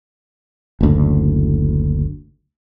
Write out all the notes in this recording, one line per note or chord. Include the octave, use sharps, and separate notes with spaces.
F#1 D2